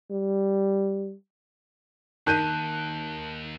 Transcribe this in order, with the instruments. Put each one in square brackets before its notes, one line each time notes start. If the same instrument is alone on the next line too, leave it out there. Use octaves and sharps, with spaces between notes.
[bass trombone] G3
[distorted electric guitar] D#2 [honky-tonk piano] D#3 [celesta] A5 [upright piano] F#6 G6 D#7